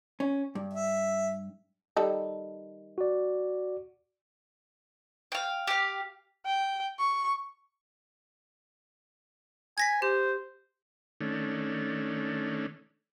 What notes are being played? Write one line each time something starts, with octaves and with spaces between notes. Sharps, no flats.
C#4
G2
E5
D#3 G3 A4
F#4 D5
F5 G5
G4 F5
G5
C#6
G#5 G#6 A#6 B6
G4 C5
D#3 A3 C#4 D4